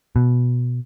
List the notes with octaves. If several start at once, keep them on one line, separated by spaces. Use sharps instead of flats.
B2